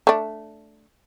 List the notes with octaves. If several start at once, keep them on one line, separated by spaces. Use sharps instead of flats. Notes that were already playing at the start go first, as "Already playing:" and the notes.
A3 D4